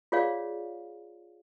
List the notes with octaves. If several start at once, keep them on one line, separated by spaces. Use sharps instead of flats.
F4 G#4 C#5 D5 F5